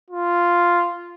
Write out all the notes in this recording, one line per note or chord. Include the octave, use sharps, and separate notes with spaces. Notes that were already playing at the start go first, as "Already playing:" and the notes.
F4